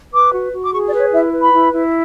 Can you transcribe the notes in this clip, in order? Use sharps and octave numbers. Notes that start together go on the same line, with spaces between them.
B4 D6
F#4
F#4
D6
G#4 C#6
D5
B4
C#5
E4 E5
B4
B5
E4
E4